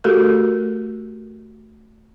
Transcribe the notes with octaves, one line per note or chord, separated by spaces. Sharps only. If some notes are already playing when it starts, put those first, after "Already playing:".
A3 F#4 G4 A4 A#4